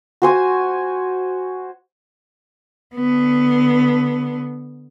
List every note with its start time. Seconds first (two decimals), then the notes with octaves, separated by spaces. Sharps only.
0.22 F#4 C5 G#5
2.95 D3 B3